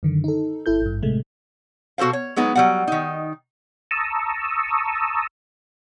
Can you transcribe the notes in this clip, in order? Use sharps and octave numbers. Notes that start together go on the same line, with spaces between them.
F#2 D3 D#3
D#4 A4
G1 E4 A4 G6
G#1 G2
A2 C3 G#3 A3
B2 F#4 A4 C5 F5
C#5
F#3 G#3 B3 D#4
F#3 G3 F#5
D#3 D#4
A5 A#5 C#6 D#6 E6